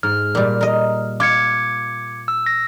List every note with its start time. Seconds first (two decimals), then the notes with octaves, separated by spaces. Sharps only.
0.03 G#2 F6
0.35 A#2 G3
0.61 A#4 D#5
1.20 F4 D6 G#6 C#7
2.28 E6
2.46 A#6